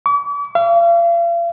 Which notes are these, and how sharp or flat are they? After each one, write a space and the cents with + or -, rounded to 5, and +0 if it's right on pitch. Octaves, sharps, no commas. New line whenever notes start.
D6 -45
F5 -40